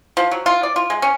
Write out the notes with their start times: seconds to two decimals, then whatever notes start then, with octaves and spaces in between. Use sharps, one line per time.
0.17 F3
0.31 F#3
0.46 F4
0.63 D5
0.76 F4
0.90 G#3
1.02 C#4